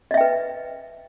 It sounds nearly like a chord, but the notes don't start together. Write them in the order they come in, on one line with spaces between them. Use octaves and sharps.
D#5 E5 G5 B4